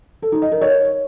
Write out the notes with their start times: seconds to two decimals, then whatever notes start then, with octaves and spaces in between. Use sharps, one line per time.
0.22 A4
0.32 D#4
0.42 D#5
0.52 A#4
0.61 C#5